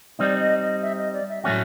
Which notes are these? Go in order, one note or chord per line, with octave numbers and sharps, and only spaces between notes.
G3 C4 D#4 D5
D#5
D#5
E5
D#5
D5
E5
A2 F#3 A3 C#4 F#4 E5